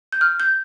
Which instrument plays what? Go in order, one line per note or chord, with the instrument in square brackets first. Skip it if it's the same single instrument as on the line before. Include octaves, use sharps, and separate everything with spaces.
[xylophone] G6
F6
G6